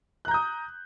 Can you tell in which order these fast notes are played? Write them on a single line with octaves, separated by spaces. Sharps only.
F#6 A#5 G6 D#6